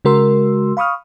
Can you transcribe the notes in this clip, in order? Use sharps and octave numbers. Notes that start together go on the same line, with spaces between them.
C#3 G#3 F#4 A#4 C6 E6
F5 B5 C#6 D#6 F6